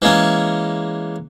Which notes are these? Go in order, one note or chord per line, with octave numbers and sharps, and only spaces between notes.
E3 G#3 A#3 C#4